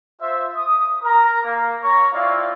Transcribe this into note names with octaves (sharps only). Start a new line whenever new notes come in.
F4 C5 E5
D#6
A#4 A#5
A#3
C#5 A#5 C#6
C4 E4 F4 C#5 D5 F5